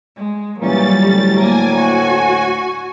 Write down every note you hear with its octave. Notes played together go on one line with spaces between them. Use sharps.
G#3
A#2 E3 F#3 G3 A#3 C#4 A6
D2 A2
A#3 A#4 G#5
F#4